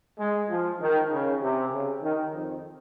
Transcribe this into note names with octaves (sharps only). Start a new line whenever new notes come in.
G#3
F3
D#3
C#3
C3
C#3
D#3
F2